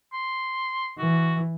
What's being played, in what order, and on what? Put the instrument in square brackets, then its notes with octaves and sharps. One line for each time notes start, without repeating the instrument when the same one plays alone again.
[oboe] C6
[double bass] E3 [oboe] F#4